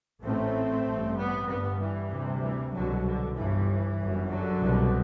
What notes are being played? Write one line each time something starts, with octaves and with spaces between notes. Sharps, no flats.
A1 A2 A3 C4
A1 G2
G3 B3
G1 G2 G3 B3
E3 G3
D2 C3
E3 G3
C2 B2 D3 F#3
D3
G1 G2 E3
G1 F#2
D3 F#3
C2 B2